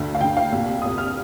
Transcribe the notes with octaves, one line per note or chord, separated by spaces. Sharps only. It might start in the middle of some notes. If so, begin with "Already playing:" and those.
Already playing: D2 D3
F5
D2 D3 G5
F5
C2 A#2
C2 A#2 D#6
F6